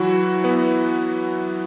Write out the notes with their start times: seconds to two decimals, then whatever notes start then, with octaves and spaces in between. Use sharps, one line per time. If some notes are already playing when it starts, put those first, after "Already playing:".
Already playing: E3 F#3 E4 F#4
0.44 B3 B4